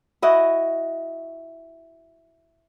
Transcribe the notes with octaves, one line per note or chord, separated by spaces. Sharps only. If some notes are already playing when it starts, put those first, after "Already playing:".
E4 F#4 D#5